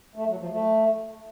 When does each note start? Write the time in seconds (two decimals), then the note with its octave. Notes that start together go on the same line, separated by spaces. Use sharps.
0.16 A3
0.27 F#3
0.39 F3
0.51 A3